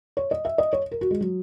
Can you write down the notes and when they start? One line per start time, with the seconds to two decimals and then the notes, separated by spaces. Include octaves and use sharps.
0.17 C#5
0.31 D#5
0.45 E5
0.58 D#5
0.73 C#5
0.91 A#4
1.01 F#4
1.11 G#3
1.21 F#3